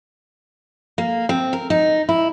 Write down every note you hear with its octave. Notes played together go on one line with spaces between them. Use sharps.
A#3
C4
A#4
D#4
E4